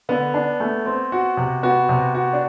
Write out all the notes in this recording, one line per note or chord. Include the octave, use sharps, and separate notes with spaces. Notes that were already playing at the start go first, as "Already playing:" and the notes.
D3 B3
D4
A3
C4
F#4
C3
B3 F#4
C3
F#4
D4